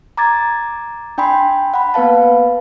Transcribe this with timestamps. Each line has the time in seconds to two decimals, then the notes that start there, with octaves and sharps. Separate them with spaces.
0.17 A#5 D6 G#6 A6
1.18 D4 G5 G#5 B5 C6
1.74 F#5 B5
1.94 A#3 B3 B4 F5 A5